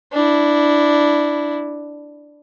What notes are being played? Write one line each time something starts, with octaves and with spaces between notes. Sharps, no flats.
D4 E4